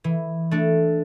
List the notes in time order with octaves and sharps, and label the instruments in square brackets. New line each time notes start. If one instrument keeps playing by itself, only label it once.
[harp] E3
A3 D4